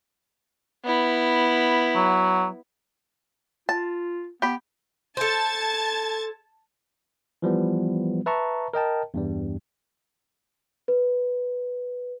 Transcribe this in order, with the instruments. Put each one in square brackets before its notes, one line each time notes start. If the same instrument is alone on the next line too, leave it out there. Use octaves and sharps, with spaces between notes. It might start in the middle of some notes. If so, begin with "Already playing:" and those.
[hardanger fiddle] B3 E4
[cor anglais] F#3
[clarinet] F4 [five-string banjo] A5
[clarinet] B3 [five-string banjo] G4 B5
[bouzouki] A4 C5 [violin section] A5 G#6 A6
[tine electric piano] E3 F3 G3 B3
B4 E5 A5 A#5 C#6
A#4 D#5 G5 A5
E2 G2 G3
[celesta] B4